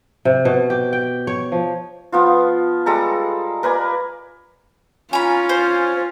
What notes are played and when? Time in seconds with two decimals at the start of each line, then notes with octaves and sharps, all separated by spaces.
0.25 C3
0.45 B2
0.70 G4
0.93 G5
1.27 C#5
1.52 F3
2.12 F3 B3 F4
2.86 G3 G#3 A4 A#5
3.63 A#4 B4 D5 G#5
5.13 C#4 F4 G#5 A#5 B5
5.49 C5